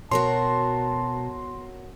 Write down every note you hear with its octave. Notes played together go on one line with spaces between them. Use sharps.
B2 F#4 A#4 C#5 A5 C6